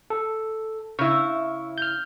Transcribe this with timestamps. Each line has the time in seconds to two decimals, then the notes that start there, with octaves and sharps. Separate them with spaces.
0.10 A4
0.99 C#3 E4 C#6
1.78 F6 G6